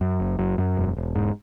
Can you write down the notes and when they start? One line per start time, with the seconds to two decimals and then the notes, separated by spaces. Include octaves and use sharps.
0.01 F#2
0.20 F#1
0.39 F#2
0.58 F#2
0.77 E1
0.97 E1
1.15 G#2